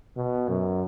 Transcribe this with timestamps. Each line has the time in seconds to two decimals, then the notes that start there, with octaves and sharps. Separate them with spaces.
0.16 B2
0.49 F#2